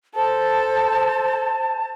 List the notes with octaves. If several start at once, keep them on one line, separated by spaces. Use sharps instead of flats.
A4 C5 A5